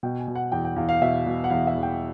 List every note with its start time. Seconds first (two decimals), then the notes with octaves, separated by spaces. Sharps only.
0.03 B2 G5
0.19 G#5
0.28 B2
0.35 F#5
0.52 E2 G5
0.65 G5
0.76 E2 F5
0.89 F5
1.02 B2 E5
1.26 B2
1.44 F#5
1.50 E2 F5
1.67 E5
1.75 E2
1.83 G5